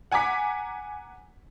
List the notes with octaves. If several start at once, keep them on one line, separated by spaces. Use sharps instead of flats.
F#5 G#5 A#5 D6 B6